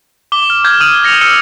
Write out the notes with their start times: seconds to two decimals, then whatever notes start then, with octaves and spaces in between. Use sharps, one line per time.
0.32 D6 G7
0.50 F6
0.64 D6 F6 G6 G#6
0.80 D#6 F6 D#7 F#7
1.03 F6 A#6 C#7 F7
1.21 E6 F6 C#7